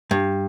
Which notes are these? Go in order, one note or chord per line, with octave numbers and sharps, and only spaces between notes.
G2